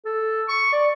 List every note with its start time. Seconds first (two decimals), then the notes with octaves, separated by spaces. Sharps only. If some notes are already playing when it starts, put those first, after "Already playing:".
0.05 A4
0.48 C#6
0.73 D5